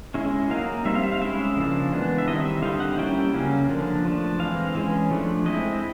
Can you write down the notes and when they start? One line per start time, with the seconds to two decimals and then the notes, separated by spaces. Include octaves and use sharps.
0.14 G#3 C#4 E4
0.50 F#3 A#3 D#4 F5
0.85 G3 C4 D#4 E5
0.95 F5
1.03 E5
1.12 F5
1.21 G#3 C#4 E4 E5
1.56 C#3 F3 A#3 D4
1.92 E3 G#3 B3 D4
2.18 E5
2.27 D#3 G3 C4 E4 D#5
2.45 E5
2.62 D3 G3 C4 D#4 F5
2.80 F#5
2.98 G3 A#3 C#4 E4 G5
3.34 C#3 F#3 A#3 C#4
3.69 D3 F3 A#3 D4
4.05 F3 A3 D4
4.39 E3 G#3 C4 F5
4.75 E3 G#3 C#4
5.11 F3 A3 D4
5.46 G#3 C4 E4 D#5